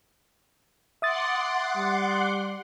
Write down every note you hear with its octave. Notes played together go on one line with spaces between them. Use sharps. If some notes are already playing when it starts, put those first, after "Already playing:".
E5 F#5 C6 D6 D#6 A6
G3